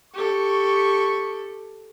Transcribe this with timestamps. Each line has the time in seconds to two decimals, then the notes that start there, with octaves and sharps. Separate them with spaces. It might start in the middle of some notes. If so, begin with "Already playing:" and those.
0.14 G4 A4 C#6